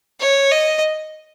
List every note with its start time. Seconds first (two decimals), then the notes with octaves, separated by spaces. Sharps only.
0.20 C#5
0.51 D#5